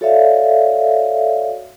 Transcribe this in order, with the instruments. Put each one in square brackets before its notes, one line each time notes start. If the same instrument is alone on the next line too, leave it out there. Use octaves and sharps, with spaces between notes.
[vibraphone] F#4 A4 C#5 D5 E5 F5